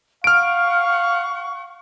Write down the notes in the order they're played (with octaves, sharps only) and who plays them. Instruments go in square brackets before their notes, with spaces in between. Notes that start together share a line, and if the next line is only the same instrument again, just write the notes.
[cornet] F5 [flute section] F#5 C#6 [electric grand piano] F6 D7